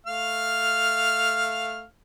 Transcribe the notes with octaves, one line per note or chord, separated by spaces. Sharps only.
A3 F5 F6